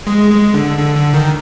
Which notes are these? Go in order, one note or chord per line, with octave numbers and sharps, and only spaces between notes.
G#3
G#3
D3
D3
D3
D#3